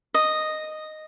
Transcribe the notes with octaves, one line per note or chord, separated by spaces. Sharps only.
D#5